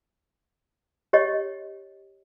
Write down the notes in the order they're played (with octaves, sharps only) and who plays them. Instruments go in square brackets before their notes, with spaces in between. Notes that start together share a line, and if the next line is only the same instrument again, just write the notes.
[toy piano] G4 C#5 D#5